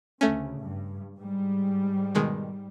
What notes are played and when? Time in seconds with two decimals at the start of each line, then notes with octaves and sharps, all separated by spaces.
0.21 D2 C#3 A3 C#4
0.59 G2
1.16 G#2 G3
2.15 B2 D#3 G#3